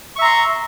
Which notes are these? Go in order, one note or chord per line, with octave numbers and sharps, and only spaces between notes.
E5 A#5 C6 C#6